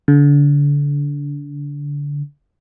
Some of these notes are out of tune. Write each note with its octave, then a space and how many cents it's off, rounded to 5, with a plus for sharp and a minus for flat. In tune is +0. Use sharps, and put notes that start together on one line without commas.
D3 -30